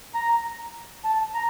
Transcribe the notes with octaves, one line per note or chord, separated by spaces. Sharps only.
A#5
A5
A#5